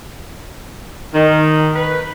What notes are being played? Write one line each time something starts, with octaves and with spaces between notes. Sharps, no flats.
D#3
B4